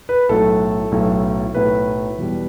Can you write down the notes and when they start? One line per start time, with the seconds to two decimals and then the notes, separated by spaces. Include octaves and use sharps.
0.09 B4
0.29 B1 A2 F#3 A4
0.92 B1 A2 F#3
1.54 B1 A2 F#3 B4
2.18 E2 B2 G3